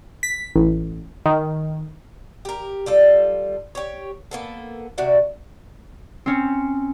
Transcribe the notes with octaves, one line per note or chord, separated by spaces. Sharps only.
B6
A1
D#3
G4 A#4
G3 F4 A4
G4 C#5
A#3 B3 A4
C3 F#4 D5 E5
C4 C#4